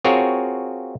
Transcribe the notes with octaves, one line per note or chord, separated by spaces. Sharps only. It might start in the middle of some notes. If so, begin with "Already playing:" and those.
C4 F4 F#4 G#4 A#4 C#5